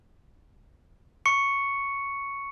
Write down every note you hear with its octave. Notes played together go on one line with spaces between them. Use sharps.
C#6 C#7